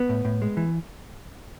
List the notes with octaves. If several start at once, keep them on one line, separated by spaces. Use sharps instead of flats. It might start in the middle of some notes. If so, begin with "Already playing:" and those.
Already playing: B3
A2
A2
G#3
E3